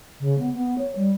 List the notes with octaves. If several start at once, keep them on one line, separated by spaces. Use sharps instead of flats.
C#3
B3
B3
C#5
G3